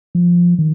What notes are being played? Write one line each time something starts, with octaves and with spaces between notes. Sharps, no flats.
F3
D#3